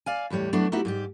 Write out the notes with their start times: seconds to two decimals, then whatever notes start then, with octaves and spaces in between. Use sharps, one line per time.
0.06 D5 F5 G#5
0.30 E2 A2 G3 C#5
0.53 F#3 A3 B3 D4 E4
0.72 A3 B3 D#4 E4 F#4 G4
0.85 G#2 G3 G4